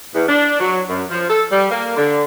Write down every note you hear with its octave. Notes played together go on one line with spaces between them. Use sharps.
E2
D4
F#3
F#2
F3
A4
G3
A#3
D3